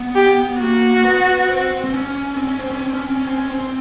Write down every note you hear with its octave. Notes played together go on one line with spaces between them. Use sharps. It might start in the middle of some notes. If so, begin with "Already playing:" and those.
Already playing: B3
G4
A#3 F#4
B3
C4
C4
C#4
C4
C#4
C4
C#4
C4
C#4
C4
C#4
C4
C#4
C4